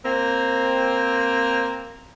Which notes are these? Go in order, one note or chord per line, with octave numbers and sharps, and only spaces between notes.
A#3 C4